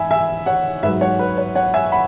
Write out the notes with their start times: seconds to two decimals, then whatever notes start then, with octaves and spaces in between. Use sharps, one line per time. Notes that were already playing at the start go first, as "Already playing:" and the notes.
Already playing: G#2 E3 E5 G#5 B5
0.11 E5 G#5
0.46 C#5 F#5
0.83 G#2 B4 E5
0.88 F#3
1.01 C#5 F#5
1.19 B4
1.38 C#5
1.55 C#5 F#5
1.74 E5 G#5
1.92 F#5 B5